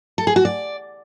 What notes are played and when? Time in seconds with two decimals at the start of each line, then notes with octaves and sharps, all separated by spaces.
0.18 A4
0.27 G#4
0.36 F#4
0.45 D5